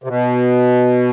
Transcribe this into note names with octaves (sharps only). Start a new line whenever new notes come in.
C3
B2